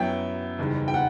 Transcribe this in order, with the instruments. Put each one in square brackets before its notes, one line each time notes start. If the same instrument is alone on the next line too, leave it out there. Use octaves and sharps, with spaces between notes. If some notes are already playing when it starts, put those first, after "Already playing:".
Already playing: [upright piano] F#2 F#3 B3 E4 [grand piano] G5
[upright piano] F#1 E2 D#3 G3
[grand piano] G5
F#5